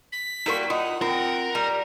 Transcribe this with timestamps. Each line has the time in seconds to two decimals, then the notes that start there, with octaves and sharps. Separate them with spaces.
0.12 B6
0.46 G3 A#3 E4 F#4 A#4 C#6
0.70 D#4 F4 F#5
1.02 C4 F4 A#4
1.55 G3 A#5